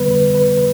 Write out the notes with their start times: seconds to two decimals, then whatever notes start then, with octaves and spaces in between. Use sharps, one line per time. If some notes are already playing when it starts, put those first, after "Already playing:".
Already playing: F2 D3 G3 B3 B4
0.11 B4
0.35 B4
0.58 B4